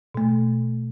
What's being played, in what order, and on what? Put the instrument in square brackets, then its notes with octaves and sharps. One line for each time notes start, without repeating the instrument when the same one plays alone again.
[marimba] B2 A3